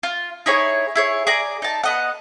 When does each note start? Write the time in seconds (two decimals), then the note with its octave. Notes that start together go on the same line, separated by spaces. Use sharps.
0.03 F4
0.46 D#4 E4 G#4 C#5
0.95 E4 G#4 C#5
1.27 G#4 D5 A#5
1.62 D#4 A5
1.84 B3 D#5 F#5